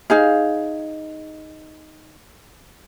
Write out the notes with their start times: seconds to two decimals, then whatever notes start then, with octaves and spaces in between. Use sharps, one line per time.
0.10 D#4 G#4 F5